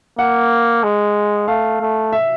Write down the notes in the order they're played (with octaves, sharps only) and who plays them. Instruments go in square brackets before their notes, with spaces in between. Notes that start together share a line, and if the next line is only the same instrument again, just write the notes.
[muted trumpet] A#3 [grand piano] F#5
[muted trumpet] G#3
[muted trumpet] A3 [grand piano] F5
[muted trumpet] A3
[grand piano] E5